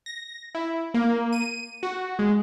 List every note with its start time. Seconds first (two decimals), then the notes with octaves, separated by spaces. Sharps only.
0.06 A#6
0.55 E4
0.94 A#3
1.32 D#7
1.83 F#4
2.19 G#3